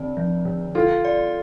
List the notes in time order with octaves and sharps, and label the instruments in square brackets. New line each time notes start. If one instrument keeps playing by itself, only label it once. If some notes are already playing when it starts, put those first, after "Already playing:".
Already playing: [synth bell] D3 C4 [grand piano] D4
[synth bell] F3
D3
[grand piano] F4 [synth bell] A4
[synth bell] D5